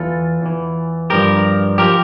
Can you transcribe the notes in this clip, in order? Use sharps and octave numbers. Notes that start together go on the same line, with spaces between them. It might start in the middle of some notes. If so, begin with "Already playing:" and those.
Already playing: E2 E3 F4 A4
E2 E3
G2 F3 G4 A#4
F3 G4 A#4